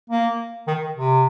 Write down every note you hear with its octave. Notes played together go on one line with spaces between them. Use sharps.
A#3
D#3
C3